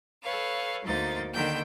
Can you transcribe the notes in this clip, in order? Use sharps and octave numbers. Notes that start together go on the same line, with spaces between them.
A4 B4 C#5 F5
D2 A#3 D#4 C5 A6
D3 D#3 A#3 G5 G6